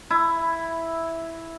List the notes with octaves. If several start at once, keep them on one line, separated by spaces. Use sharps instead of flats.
E4